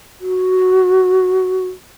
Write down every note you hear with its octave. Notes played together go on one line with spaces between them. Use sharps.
F#4